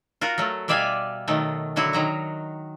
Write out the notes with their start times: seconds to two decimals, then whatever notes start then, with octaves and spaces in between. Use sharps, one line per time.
0.21 F4 F#4 A#4
0.38 F#3 A3
0.68 B2 G3 D5 E5 F5 G#5
1.28 B2 D#3 F#3 A3
1.76 D3 F#3 E4 F#4
1.93 D#3 F#3 A#5